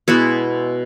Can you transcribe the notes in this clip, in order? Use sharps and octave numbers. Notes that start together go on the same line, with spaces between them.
B2 G#3 B3 E4 F#4